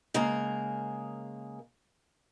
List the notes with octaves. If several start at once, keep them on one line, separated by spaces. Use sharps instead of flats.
C#3 G#3 A#3 A#4